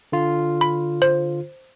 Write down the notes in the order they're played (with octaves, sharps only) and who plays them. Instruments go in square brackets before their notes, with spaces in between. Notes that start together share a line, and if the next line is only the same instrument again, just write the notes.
[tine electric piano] D3 F4
[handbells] B5
C5